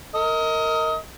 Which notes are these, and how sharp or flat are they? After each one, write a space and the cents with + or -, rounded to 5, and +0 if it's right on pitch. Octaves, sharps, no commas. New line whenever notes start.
A#4 -20 D#5 +25